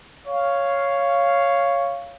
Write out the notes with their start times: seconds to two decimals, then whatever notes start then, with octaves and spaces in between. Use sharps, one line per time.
0.27 C#5 F5